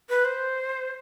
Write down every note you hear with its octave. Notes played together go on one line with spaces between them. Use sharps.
B4
C5